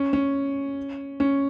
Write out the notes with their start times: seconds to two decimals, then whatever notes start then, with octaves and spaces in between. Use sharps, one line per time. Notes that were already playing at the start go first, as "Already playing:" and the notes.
Already playing: C#4
0.13 C#4
1.20 C#4